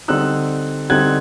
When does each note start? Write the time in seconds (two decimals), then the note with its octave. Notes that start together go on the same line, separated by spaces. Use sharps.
0.08 D3 G3 C4 D#4 E6 F#6
0.90 D3 G3 C4 D#4 F#6 G#6